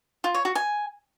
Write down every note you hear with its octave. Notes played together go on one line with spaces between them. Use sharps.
F4
C#5
F#4
G#5